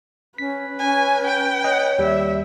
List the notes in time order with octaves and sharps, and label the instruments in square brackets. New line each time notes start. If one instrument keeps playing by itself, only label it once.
[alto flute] C#4 [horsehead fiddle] B4 [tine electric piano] B6
[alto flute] C#4 [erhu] G#5
[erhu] G5
[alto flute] C#5 [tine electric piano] D#5 F#6
[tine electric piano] D#2 G3 [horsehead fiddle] E5